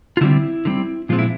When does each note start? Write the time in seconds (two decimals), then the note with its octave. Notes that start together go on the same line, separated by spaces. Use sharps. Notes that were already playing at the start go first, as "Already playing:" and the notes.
0.17 F4
0.21 D3 G3 C4 E4
0.65 D3 G3 C4
1.09 A#2 F3 G#3 C4 F4
1.19 E4